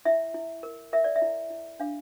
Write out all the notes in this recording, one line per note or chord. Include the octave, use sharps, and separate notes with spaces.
E4 E5
E4
A#4
A#4 E5
D5
E5
E4
E4
D4 F5